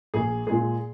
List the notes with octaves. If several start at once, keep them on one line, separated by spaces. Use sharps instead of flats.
A#1 G#4
A#2 G#3 G#4